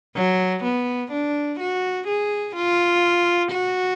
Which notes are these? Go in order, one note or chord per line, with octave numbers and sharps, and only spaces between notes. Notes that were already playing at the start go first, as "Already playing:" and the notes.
F#3
B3
D4
F#4
G#4
F4
F#4